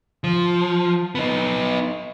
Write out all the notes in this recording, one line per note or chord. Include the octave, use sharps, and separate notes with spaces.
F3
B3 D#4